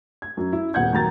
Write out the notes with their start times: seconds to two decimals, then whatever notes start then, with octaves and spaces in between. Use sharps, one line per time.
0.22 G#6
0.37 F#2
0.53 E4
0.74 D#1 B3 F#5 G6 G#6
0.93 D#2 F#3 A#5 A6